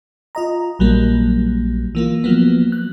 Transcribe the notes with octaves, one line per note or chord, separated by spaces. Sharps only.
F4 D#5 A#5
A#1 F#3 G3 A#3
E3 A#3 F4
F3 F#3 A#3 B3
F#6